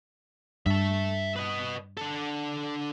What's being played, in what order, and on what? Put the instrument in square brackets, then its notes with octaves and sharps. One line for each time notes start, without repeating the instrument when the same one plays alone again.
[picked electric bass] G2 [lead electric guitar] E5 A5
[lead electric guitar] B4 D#5
D4 A4